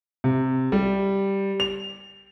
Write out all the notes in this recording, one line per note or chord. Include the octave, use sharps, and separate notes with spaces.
C3
G3
F7